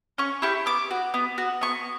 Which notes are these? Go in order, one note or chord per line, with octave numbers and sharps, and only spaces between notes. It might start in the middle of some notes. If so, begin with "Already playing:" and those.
C#4 C#6
E4 G4 C#6
B3 D6
F#4
B3
F#4
B3 C#6